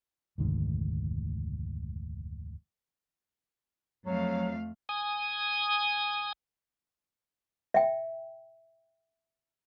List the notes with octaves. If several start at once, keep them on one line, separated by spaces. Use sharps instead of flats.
F1 D2 G#2 D#3
F2 F#3 A3 F5
G#5 D#6
E5 G5